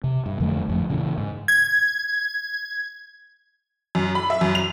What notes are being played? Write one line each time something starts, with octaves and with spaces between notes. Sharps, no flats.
C3
G2
F2 D3 F#3 A3
A#1 F2 A2
A#2 C#3 E3
G#2
G#6
F#2
B5
E5
F#2
F7